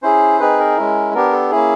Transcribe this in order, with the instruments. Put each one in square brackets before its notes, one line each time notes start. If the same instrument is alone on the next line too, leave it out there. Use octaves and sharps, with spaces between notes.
[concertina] C#4 E4 G#4 C5
C4 D#4 G#4 B4
A#4
G#3 C#4 E4
B3 D4 G4 A#4
A4
A#3 C#4 E4 G#4